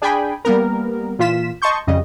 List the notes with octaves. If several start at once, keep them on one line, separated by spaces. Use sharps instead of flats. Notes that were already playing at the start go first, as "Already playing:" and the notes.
D4 G#4 D5 G5 G#5 B5
G3 A#3 B3 A#4
A#2 E3 F4 B6 E7
D#5 A5 C6 C#6 G6
F2 C#3 G3 D#5